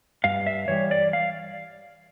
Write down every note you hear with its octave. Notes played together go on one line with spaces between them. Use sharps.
G2 F5
E5
E3 G3 C#5
D5
F5